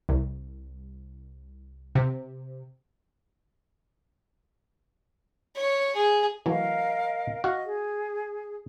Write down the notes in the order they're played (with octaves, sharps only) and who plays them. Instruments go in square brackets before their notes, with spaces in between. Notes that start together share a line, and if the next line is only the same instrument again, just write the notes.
[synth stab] C2
C3
[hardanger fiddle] C#5
G#4
[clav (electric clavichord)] E3 F#3 A3 [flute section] A#4 D#5 F5
[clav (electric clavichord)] F#4 F5 F#5 [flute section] D#5
[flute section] G#4